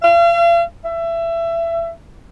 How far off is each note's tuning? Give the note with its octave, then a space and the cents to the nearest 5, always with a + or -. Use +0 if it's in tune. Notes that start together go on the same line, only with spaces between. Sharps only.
F5 -40
E5 +25